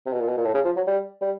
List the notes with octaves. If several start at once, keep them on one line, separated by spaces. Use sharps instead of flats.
C3
B2
A#2
B2
A#2
A2
C#3
F3
F#3
G3
G3